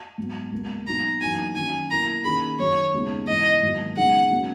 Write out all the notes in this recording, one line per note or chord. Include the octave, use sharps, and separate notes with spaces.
G#2 F#3 B3
C#2 B2 A#3
B2 F#3 B3 D#4 A#5
F#2 E3 A#3 D#4 F#4 G#5
D#3 F#3 C#4 G#5
B2 A#3 E4 A#5
D#3 A#3 C#4 G#4 B5
F#2 D#3 F#3 C#5
D#2 C#3 G#3 B3 D#4
G#2 E3 B3 E4 D#5
G#2 D#3 F#3 A#3
C#3 G#3 B3 D#4 G#4 F#5
C#3 F#3 A#3 C#4 F#4